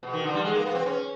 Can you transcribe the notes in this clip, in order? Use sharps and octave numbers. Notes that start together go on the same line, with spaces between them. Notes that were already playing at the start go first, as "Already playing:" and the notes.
B2
D#3
D3
G3
G#3
A#3
B3
C4
C#4